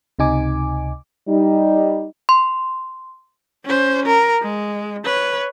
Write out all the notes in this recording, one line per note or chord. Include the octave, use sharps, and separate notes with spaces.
C#2 C3 D#4 G#5 D6
G3 D#4
C6
C#4 C5
A#4
G#3
B4 C#5